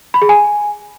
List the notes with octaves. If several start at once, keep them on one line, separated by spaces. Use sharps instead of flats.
B5
G#4
G#5